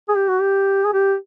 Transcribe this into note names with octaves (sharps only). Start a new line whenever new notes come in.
G#4
G4
F#4
G4
G#4
G4